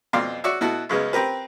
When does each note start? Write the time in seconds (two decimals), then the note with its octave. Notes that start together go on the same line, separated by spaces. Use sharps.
0.13 F2 B2 D5 F5 C6
0.44 F#4 C#5 D5 E5
0.61 B2 E4 F#4 A4
0.89 F#2 C#3 G#3 B3
1.13 C4 G4 A#4 B4